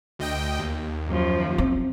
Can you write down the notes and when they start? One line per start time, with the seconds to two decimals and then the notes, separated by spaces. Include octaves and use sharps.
0.19 D2 D#5 G5
0.59 D#2
1.07 F#2 F3
1.58 C4